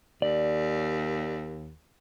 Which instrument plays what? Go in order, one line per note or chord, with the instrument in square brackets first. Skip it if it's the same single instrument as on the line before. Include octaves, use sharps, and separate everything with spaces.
[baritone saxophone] D#2 [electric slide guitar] D5